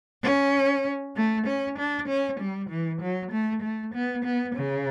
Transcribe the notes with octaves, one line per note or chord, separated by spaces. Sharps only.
C#4
A3
C#4
D4
C#4
G3
E3
F#3
A3
A3
B3
B3
C#3